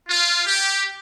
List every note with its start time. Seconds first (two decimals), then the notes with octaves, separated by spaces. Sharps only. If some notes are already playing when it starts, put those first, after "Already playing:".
0.08 F4
0.46 G4